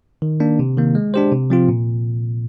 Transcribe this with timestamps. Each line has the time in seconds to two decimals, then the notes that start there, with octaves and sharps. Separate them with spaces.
0.22 D#3
0.40 A#3 D4
0.59 C3
0.77 D#3 A#3
0.95 G#3
1.14 D4 G4 C5
1.32 C3
1.50 F3 C4 F4
1.69 A#2